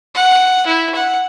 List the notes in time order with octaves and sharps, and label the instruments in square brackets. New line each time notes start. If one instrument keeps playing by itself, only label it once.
[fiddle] F#5
E4
F#5